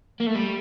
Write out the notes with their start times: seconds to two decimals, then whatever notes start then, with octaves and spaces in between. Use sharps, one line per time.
0.20 A#3
0.27 A3
0.35 G3